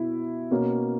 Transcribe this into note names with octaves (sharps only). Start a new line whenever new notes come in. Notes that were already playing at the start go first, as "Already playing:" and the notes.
Already playing: B2 E4
B2 A#3 C#4